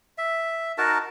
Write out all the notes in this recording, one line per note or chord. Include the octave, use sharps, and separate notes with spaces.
E5
D#4 F#4 A#4 A5